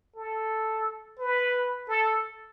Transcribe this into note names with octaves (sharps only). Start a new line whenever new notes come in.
A4
B4
A4